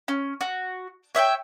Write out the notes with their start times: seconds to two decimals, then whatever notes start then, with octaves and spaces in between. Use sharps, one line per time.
0.08 C#4
0.41 F#4
1.15 C#5 E5 F#5 G5